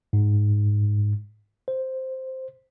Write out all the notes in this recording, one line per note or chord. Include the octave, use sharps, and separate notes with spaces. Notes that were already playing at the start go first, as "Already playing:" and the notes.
G#2
C5